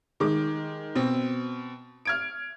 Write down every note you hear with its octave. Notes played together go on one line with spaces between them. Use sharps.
D#3 G#3 D6
B2 C4
F6 G#6 D7